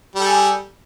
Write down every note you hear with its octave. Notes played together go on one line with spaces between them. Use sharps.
G3 G#4 A4